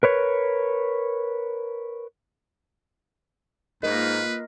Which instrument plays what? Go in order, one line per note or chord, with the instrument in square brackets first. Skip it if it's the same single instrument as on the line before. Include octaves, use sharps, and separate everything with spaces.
[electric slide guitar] A#4 B4 C#5
[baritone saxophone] G#2 [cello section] A#3 F4 [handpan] A#4 D#5 [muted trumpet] B4